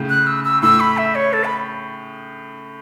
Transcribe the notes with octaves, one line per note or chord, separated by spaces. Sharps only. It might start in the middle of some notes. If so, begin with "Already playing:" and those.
Already playing: A2 C#3
F#6
E6
E6
A2 E6
B5
E5
C#5
A4
B5